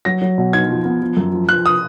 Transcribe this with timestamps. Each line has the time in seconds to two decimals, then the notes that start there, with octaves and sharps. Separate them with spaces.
0.05 F#3 A#6
0.22 F#3
0.38 B2
0.53 D#4 G#6
0.69 F3
0.85 B3
1.02 F3
1.17 F#2
1.33 F3
1.49 F3 F#6
1.66 D#6